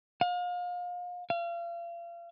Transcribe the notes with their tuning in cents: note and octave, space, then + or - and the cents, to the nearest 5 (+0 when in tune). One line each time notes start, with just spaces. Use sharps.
F5 +35
F5 -35